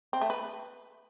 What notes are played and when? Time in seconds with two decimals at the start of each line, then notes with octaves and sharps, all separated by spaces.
0.13 C4
0.21 A3
0.30 B4